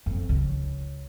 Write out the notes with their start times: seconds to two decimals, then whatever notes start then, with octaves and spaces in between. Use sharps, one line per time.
0.06 F2
0.29 C#2 C#3